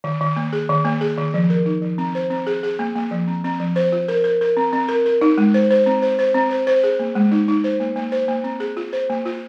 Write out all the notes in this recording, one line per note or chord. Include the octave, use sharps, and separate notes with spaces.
D#3
D#3
A#3
G#4
D#3
A#3
G#4
D#3
F3
A#4
D#4
F3
C4
C5
C4
G#4
G#4
A#3
A#3
F3
C4
C4
F3
C5
F4
A#4
A#4
A#4
C4
C4
A#4
A#4
D#4
G#3
C5
C5
C4
C5
C5
C4
C5
C5
G#4
A#3
G#3
D#4
D#4
C5
A#3
A#3
C5
A#3
C4
G#4
F4
C5
A#3
F4